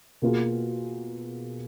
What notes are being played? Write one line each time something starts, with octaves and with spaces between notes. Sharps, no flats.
B2 A#3 F4 G#4